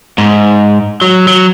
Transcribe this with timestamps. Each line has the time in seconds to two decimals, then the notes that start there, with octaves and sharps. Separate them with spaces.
0.18 G#2
1.02 F#3
1.27 F#3